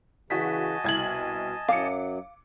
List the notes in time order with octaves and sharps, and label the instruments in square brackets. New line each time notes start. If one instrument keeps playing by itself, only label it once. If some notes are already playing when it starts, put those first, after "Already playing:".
[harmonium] C#3 E3 [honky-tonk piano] F#4 B6 [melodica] D#5 G#5 A5
[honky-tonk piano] C2 G#6 F#7 [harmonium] B2
[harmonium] F#2 F#3 [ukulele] F5 [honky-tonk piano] D6 C#7